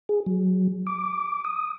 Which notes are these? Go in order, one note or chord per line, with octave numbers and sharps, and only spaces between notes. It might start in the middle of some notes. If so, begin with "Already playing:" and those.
G#4
F#3
D6
D#6